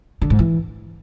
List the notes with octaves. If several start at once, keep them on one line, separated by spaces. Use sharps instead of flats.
D3
G#2
E3